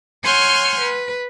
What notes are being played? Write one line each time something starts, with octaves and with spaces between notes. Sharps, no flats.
C#5 F#5 G#5 C6 F6 G6
B4